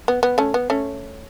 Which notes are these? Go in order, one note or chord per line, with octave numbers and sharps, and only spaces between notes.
B3
B3
A3 C#4
B3
A3 C#4